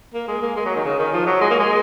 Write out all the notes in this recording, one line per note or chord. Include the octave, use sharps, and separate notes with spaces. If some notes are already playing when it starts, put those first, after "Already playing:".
A#3
G#3
A#3
G#3
F#3
D#3
C#3
D#3
F3
F#3
G#3
A#3
G#3